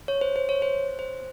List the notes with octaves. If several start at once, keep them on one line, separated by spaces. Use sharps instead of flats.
C#5
C5
C5
C#5
C5
C5